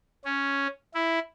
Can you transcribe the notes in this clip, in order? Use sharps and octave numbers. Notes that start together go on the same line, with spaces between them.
C#4
E4